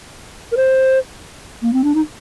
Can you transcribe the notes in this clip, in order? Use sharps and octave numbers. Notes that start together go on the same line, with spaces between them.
A#4
C5
A#3
C4
D4
D#4